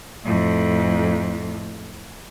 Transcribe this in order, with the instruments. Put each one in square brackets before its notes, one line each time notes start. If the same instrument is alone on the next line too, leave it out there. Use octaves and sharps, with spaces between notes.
[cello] F2 A2